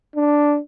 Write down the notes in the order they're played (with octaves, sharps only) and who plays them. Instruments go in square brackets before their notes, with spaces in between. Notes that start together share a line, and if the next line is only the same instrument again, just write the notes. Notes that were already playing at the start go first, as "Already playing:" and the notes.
[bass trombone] D4